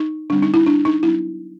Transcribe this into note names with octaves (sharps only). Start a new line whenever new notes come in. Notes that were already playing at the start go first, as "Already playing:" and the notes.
Already playing: D#4
D3 G3 C4 D4
D#4
E4
D4
D#4
F#3 B3 D4 E4